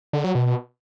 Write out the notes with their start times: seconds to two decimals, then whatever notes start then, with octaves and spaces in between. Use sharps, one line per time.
0.13 D3
0.24 F#3
0.35 B2